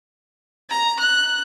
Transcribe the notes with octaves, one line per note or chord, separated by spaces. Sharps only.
A#5
F#6